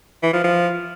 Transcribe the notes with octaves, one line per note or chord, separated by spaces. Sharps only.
E3
F3
F3